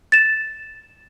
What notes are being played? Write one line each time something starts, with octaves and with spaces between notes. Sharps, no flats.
A6 E7